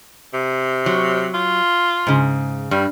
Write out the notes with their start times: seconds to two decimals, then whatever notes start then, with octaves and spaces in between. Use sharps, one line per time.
0.34 C3
0.86 F#3
1.34 F4
2.07 G#2 C#3
2.71 G2 G3